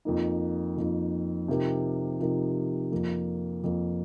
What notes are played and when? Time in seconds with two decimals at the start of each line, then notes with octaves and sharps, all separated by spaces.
0.05 F2 F3 A#3 D#4
0.77 F2 F3 A#3 D#4
1.48 C3 F3 D#4 G4 A#4
2.20 C3 F3 D#4 G4 A#4
2.92 F2 F3 A#3
3.64 F2 F3 A#3